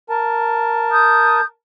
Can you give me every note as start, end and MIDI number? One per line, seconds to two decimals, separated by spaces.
0.10 1.41 70
0.10 1.41 81
0.91 1.44 87
0.91 1.44 91